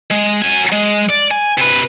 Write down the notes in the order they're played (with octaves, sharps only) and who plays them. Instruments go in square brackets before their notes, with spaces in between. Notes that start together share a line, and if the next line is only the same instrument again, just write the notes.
[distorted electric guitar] G#3
F#3 G#5
G#3
D5
G#5
C3 B4